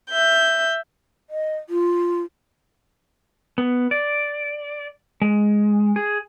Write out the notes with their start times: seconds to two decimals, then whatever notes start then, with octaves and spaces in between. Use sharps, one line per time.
0.10 E5 G6
1.30 D#5
1.69 F4
3.58 B3
3.91 D5
5.22 G#3
5.96 G#4